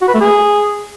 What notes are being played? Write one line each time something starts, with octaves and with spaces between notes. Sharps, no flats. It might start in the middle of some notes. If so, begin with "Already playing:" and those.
F#4
B4
A3
G#4